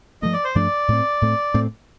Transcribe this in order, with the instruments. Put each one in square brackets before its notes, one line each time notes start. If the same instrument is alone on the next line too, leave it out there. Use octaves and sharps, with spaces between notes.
[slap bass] G2 F3 A3 D4 [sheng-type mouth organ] D#5
[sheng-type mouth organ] D5
C5
[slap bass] G2 F3 A3 D4 [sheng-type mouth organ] D5
[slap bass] A2 A3 C4
A2 A3 C4
A2 A3 C4